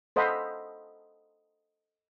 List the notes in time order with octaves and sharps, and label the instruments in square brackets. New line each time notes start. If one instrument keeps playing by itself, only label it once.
[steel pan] A4 C5 D#5 F5 F#5 B5